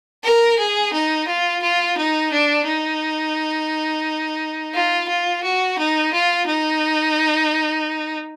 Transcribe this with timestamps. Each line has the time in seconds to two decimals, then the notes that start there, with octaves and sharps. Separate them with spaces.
0.24 A#4
0.59 G#4
0.93 D#4
1.27 F4
1.63 F4
1.97 D#4
2.32 D4
2.66 D#4
4.74 F4
5.08 F4
5.43 F#4
5.78 D#4
6.13 F4
6.47 D#4